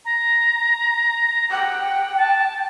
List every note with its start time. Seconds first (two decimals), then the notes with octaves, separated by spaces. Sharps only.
0.05 A#5
1.51 F#5 G5
2.17 A5